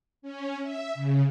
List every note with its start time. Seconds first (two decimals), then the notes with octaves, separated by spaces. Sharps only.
0.22 C#4
0.63 E5
0.95 C#3